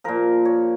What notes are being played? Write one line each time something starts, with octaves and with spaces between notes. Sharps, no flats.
A#2 F3 A#4
C#5